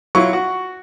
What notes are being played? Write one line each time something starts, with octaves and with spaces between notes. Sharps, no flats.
F#3 E4 F4 C#6
F#4